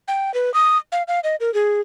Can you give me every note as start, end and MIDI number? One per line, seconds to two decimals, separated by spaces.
0.08 0.33 79
0.34 0.53 71
0.54 0.77 87
0.92 1.03 77
1.08 1.20 77
1.24 1.36 75
1.40 1.53 70
1.54 1.81 68